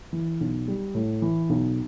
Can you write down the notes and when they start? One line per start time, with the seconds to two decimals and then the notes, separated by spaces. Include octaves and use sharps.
0.13 E3
0.41 B1
0.68 G3
0.95 A2
1.22 E3
1.50 B1